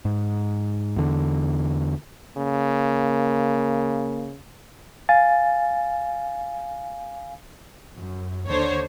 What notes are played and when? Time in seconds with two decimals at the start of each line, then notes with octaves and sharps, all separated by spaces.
0.05 G#2
0.96 E2 D3
2.37 C#3 A#3
5.09 F5 G#5 A6
7.96 F#2
8.47 D#2 D3 C5 C#5